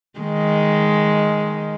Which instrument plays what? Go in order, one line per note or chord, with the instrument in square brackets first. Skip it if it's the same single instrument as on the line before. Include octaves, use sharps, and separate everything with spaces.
[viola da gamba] D#3 G#3